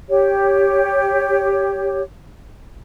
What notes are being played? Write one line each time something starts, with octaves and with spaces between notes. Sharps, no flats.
G4 C#5